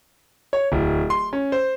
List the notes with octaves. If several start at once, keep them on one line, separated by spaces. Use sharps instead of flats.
C#5
D1
C6
C#4
C5